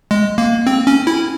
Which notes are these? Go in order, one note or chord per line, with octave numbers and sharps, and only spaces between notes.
G#3
A#3
C4
C#4
E4